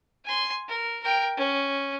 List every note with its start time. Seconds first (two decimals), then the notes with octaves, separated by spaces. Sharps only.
0.24 G#5 C6
0.68 A#4
1.03 A#4 G5
1.37 C#4